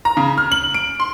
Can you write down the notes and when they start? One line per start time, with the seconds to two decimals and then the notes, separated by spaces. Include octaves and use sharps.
0.05 A#5
0.17 C#3
0.38 F6
0.52 F#7
0.74 D7
1.00 C6